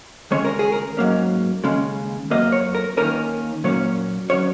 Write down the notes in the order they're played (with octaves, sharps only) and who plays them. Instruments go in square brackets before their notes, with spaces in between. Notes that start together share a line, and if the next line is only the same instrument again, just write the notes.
[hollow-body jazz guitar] D#2 C#3 G#3 C#4 C#5
A#4
G#4
A#4
G#2 F#3 A#3 C#4
D#2 C#3 G#3 C#4
F#2 F#3 A#3 D#5
C#5
A#4
D#2 D#3 A#3 C#4 A#4
A#2 F#3 A#3 C#4 C#5
F#3 C#4 C#5